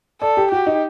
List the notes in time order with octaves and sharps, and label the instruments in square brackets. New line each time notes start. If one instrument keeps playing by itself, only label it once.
[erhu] A4 [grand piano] D5
[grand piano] G4
[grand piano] F#4 [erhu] G4
[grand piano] D#4